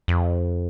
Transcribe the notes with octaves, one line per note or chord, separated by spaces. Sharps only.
F2